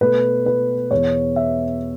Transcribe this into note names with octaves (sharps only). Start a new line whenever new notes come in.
B2 A3 B4
B4
E2 B2 B3 C#5
E5